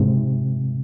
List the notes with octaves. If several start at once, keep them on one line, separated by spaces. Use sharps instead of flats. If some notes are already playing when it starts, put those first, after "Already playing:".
Already playing: G#2 C3